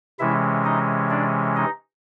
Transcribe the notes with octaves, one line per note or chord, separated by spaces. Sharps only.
C3 E3 G#3 C#4 E4 E5
D#4 D#5
D4 D5
D#4 D#5